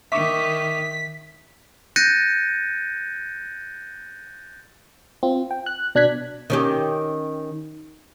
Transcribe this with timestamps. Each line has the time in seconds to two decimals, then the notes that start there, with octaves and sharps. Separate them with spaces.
0.12 D#3 E5 C#6 D6 B6
1.96 F#6 G6 A6 A#6 C#7 D#7
5.23 C4 F4
5.51 G5
5.66 F#6
5.95 B2 D4 F#6 G#6 B6
6.50 D#3 C#4 G4